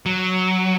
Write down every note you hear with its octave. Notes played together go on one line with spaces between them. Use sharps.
F#3